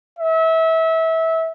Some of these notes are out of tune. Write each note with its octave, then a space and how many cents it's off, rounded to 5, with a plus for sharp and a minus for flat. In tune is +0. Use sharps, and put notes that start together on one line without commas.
E5 -25